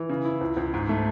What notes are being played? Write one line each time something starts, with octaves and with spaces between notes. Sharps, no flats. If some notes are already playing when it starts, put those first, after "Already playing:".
Already playing: E3
C#3
E4
C#2
C#2
G#2
A3